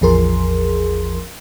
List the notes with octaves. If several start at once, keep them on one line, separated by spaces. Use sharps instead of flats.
A1 E2 F3 G#4 A#4 C6